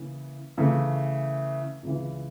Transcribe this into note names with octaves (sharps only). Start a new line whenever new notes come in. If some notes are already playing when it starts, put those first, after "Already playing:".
Already playing: C#3 E3 A#3
C#3 E3 A3
C#2 C#3 E3